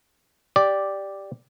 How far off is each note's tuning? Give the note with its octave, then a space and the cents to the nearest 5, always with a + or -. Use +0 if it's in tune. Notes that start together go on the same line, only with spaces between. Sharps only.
G4 +0 D5 +0